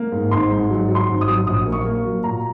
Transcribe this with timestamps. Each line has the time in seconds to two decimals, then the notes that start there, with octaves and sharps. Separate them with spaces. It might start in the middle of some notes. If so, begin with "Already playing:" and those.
Already playing: A#3
0.12 G#2
0.31 G#1 C6
0.51 G#2
0.70 F#3
0.89 F#3
0.95 C6
1.09 G#1
1.21 D#6
1.28 F#3
1.47 A#1 D#6
1.65 A#3
1.72 C#6
1.85 A#3
2.05 F#3
2.24 A#2 A#5